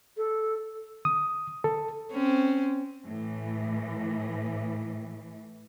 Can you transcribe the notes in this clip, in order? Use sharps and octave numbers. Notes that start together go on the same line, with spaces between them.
A4
D#6
A4
C4 C#4
A2 E3